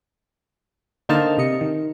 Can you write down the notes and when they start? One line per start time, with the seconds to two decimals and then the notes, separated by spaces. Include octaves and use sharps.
1.09 D3 A#3 D#4 C5 A5 F6
1.38 C3 D#5 C#7
1.61 D#3